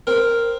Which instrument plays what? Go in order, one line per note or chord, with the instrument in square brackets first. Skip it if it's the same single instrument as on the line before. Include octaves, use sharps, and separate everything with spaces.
[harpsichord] C4 A#4